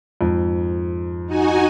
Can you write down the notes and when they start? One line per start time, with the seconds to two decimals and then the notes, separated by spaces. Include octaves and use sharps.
0.21 F2 G#2
1.26 D#4 F#4 G#5